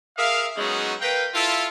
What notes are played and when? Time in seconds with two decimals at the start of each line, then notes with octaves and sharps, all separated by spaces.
0.18 G#4 A#4 E5 F5
0.57 F#3 G#3 B3 C#4 D#4 F#4
1.01 A#4 B4 F5 G5
1.34 E4 F4 A4